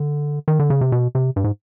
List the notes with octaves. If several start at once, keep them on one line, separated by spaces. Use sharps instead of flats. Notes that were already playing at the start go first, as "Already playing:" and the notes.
Already playing: D3
D#3
D3
C#3
C3
B2
C3
G2
G#2